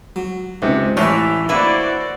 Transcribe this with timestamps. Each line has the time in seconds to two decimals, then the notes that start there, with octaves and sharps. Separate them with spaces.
0.16 F#3
0.62 C#2 G#2 C3
0.97 A1 A2 E3 C#5 D5 E5 G5
1.49 A#3 D4 E4 F#4 B4 C5 D5